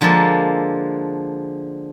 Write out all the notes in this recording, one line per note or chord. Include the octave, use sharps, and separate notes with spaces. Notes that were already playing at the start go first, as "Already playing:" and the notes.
D3 F3 G#3 A#3 A4 B4